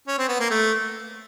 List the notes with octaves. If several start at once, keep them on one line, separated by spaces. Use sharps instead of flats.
C#4
C4
B3
A#3
A3